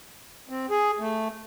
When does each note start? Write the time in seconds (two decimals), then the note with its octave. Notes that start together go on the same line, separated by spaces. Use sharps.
0.49 C4
0.70 G#4
0.99 A3